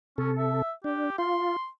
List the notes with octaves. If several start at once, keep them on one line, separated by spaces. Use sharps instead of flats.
C3 C#4 A4
E5
D4 G4
F4 C6